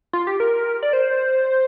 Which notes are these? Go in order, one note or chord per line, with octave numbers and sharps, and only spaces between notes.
F4
G4
A#4
D5
C5